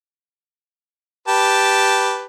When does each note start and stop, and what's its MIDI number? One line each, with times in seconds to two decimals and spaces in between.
1.28 2.25 67
1.28 2.25 71
1.28 2.25 81